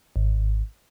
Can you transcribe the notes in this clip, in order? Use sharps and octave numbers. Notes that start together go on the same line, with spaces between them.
G#1